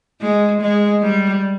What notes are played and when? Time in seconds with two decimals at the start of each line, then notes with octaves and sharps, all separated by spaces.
0.21 G#3
0.61 G#3
1.02 G3